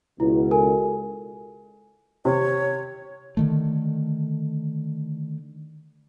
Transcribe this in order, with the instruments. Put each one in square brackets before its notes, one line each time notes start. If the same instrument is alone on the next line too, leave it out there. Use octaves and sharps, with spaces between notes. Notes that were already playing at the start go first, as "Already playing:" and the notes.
[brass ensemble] C#2 B2 [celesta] E4
[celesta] A4 A#4 G#5
[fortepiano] C3 [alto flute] C#5
[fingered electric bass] D3 D#3 A3